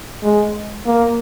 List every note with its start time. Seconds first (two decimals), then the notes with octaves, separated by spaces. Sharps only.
0.23 G#3
0.86 A#3